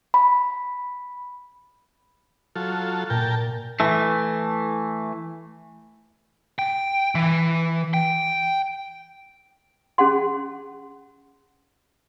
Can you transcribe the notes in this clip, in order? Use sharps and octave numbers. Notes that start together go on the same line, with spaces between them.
B5
F#3 F4 A4
A#2 A#4 G5 A5
E3 A3
G5
E3
G5
C#4 G#4 F#5 C6